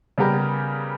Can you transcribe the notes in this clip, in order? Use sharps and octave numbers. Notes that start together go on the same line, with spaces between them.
C#3 G3 B3 G4 A#4